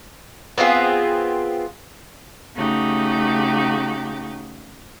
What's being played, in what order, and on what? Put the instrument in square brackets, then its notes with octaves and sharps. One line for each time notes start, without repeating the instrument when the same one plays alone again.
[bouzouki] B3 C4 F4 G#4
[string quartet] C#3 A3 D#4 F#4 G4